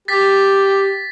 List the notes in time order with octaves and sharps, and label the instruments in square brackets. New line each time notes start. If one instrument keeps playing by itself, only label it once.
[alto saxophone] G4 [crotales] A6 B6